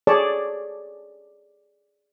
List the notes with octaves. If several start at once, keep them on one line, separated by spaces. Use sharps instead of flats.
G#4 A4 C#5 D5 A5